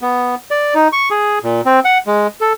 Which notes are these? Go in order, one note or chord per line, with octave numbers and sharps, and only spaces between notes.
B3
D5
D#4
C#6
G#4
A#2
C4
F#5
G#3
A4